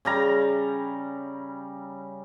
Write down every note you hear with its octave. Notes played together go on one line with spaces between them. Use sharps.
C#3 G3 A#5